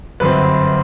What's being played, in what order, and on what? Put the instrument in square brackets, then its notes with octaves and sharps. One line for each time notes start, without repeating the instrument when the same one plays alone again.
[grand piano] G1 F#2 F#3 C4 B4